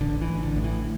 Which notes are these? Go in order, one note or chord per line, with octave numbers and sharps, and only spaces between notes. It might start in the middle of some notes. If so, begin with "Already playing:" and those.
A1 D3
E3
A1
D3
A2
E3